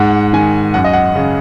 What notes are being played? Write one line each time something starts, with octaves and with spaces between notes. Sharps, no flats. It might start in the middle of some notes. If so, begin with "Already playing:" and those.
Already playing: G#2 F#5
D#3 G#5
F#2 F#5
D#5
F#5
C#3